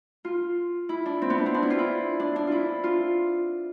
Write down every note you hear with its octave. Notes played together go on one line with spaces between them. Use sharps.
F4
E4
D4
C4
B3
D4
C4
D4
E4
F4
E4
D4
D4
E4 F4
F4